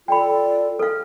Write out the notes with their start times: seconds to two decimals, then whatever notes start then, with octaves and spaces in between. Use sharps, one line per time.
0.08 F4 A4 D5 G5 B5
0.79 A4 F5 F6